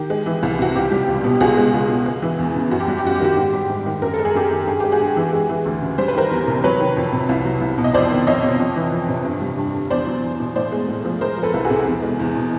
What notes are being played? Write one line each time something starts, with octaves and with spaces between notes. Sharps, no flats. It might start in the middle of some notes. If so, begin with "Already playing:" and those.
Already playing: D#3 G4
G#3
E3
C2
C3 F#4
C#2 G4
G3
C#2
B2
C#2 F#4 G#4
G#3
C#2
B2
G#3
E3
E2
C#3
F#2 F#4
G4
G3 F#4
G4
F#2 F#4
G4
D#3 F#4
G#2 G4
G3
G#2
D#3
F#2 A#4
A4
G#3
G#4
F#2 G4 A4
D#3
G2 G#4
G#3 G4
F#4 G#4
G2
E3
G#3
E3
D2
C#3
G3 C5
B4
D#3 A#4 C5
E2
C3
F#3 B4 C#5
D#3
F2
C3
C2
F#3
C2
B2
D#5
F2 C5 D5
D#3
F2 C#5 D#5
C3
F2
E3
F2
C3
G2
G3
G2
D3
E2 C5 D5
F#3
E2
B2
A2 C5 D5
G#3
A2
F3
G#3 A#4 C5
F3
A4 B4
C2
F#4 G#4
C3
E2
G#3
E2
B2